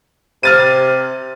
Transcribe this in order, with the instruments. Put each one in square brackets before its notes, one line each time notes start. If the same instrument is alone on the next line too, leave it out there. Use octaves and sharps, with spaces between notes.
[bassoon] C3 [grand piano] F6 A6 D#7